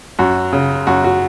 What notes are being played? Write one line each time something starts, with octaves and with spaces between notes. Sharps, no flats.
F#2 F#4
C#3
F#2 F#4
F#4